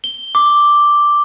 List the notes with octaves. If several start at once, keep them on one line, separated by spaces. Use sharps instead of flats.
G7
D6